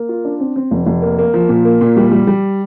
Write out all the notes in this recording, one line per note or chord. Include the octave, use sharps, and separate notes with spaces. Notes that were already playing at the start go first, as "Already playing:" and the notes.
Already playing: A#3
F4
D4
C4
C4
F1
F1
A#3
A#3
F3
A#2
A#3
A#2
G3
G3
G3